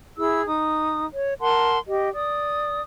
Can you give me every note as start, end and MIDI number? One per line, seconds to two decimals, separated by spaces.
0.17 0.44 64
0.17 0.44 68
0.17 0.44 88
0.46 1.06 63
0.46 1.06 87
1.13 1.34 73
1.41 1.77 70
1.41 1.77 78
1.41 1.77 81
1.41 1.77 84
1.87 2.09 67
1.87 2.09 75
2.13 2.81 74
2.13 2.81 87